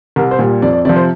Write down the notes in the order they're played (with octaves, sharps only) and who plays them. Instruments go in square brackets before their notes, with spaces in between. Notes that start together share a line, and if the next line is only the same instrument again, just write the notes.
[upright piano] C2 A#4
C5
A#2 G3
F2 D5
D5
C3 F3 D5
C5